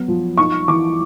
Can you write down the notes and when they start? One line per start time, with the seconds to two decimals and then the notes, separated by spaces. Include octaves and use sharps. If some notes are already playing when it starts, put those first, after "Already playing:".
Already playing: F#3 B3
0.08 F3
0.38 D#4 C#6
0.68 E3 D6